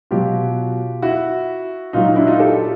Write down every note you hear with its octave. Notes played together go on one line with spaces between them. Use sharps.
B2 F#3 F4 G4
E4 F#4
A#2 F#3 D#4 F4
D#4
D4 E4
D#4 F4
G4 A4